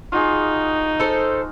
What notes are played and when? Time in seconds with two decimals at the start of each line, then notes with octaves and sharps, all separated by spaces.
0.12 D#4 F4 F#4 G#4
1.00 A4 C5